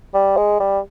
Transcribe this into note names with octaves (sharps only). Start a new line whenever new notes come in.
G3
G#3
G3